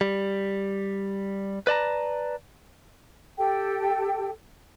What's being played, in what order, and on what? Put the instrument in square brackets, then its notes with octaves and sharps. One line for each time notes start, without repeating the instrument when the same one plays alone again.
[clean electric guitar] G3
B4 D5 A5 A#5
[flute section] G4 A4 G5